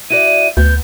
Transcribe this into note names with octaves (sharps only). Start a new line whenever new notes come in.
E4 F#4 D5 D#7
D2 B3 G6